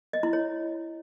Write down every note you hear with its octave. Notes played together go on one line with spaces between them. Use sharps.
D#5
E4
C#5